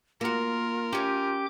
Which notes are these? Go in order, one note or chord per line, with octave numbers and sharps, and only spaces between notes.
A#3 F4 F#4 A#4
C#4 G4 C#5 D6 G6